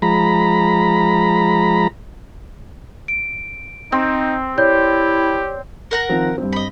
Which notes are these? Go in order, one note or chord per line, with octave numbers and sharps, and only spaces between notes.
F3 G#3 A#5 B5
D7
C4 D#4
E4 G4 C#5 D5 G6
A#4 F#5 A#5
D#3 F3 C4
G2 C4
D#5 B5